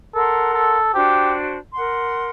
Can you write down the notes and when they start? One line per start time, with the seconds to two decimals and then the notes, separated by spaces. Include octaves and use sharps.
0.14 A4 A#4 F#5 C6
0.54 A4
0.94 D4 F#4 G4 C5
1.73 A#4 F#5 C6